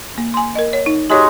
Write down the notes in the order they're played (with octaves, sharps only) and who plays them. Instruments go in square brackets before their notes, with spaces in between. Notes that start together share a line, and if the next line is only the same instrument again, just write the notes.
[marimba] A#3
G#5 C6
A#4 D#5
C#5
D#4
[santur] G#3 D#4 F#4 [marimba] G4 C#5